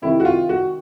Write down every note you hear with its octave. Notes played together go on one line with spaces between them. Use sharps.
C3 D#3 E4
F#4
F4
F#4